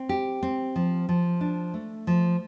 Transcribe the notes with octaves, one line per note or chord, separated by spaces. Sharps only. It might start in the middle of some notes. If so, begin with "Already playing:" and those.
Already playing: C4
G4
C4
F3
F3
D4
A3
F3